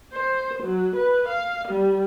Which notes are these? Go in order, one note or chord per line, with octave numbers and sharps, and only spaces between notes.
C5
F#3
B4
F5
G3